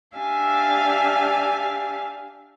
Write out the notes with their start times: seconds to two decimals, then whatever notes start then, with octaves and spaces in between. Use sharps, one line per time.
0.16 D4 G4 E5 F5 G#5